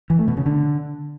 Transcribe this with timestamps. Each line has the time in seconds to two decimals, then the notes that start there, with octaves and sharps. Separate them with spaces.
0.10 E3
0.19 A3
0.28 B2
0.37 C#3
0.46 D3